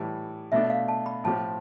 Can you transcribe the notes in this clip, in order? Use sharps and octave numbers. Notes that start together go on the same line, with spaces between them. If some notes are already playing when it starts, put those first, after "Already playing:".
Already playing: A2 E3 G3
B2 A3 D4 E5
F5
A5
B5
A2 F3 C4 G4 A5